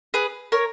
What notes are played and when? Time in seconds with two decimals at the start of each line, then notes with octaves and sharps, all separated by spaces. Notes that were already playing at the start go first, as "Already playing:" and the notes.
0.14 G#4 B4
0.52 A#4 C#5